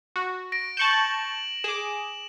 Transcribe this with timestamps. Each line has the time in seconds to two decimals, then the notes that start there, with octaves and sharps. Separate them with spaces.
0.16 F#4
0.52 A#6 D7
0.77 A5 C#6 G6 E7 F#7
1.64 G#4 D6 E7